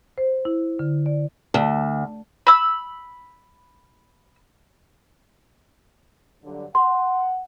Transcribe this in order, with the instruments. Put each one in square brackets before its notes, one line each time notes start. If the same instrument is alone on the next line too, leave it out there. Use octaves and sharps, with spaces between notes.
[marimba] C5
E4
D3
D5
[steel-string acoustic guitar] D2
[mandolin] B5 E6
[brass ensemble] G2 D3 F#3
[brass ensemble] F#5 [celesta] C6